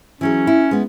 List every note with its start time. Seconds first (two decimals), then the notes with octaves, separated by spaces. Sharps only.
0.21 E3 F#3 C#4 G#4
0.47 E4
0.71 G#3 B3